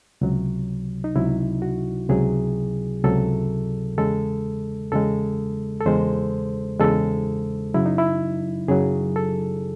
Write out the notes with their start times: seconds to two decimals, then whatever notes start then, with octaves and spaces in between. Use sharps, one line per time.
0.21 C#2 C3 F#3
1.04 D#4
1.16 C#2 C3 F#3 E4
1.62 F#4
2.09 C#2 C3 F#3 G#4
3.04 C#2 C3 F#3 A4
3.97 E2 C#3 G#3 A4
4.92 E2 C#3 G#3 A4
5.81 A4
5.86 E2 C#3 G#3 C5
6.80 E2 C#3 G#3 A4
7.74 F#2 C#3 F#3 E4
7.86 D#4
7.98 E4
8.68 F#2 C#3 F#3 G#4
9.16 A4